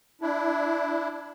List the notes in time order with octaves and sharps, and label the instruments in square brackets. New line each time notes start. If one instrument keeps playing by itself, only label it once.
[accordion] D4 E4